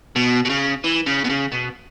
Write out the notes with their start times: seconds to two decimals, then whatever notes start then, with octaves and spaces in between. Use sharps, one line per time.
0.16 B2
0.45 B2
0.50 C#3
0.84 E3
1.07 C#3
1.25 B2
1.30 C#3
1.52 B2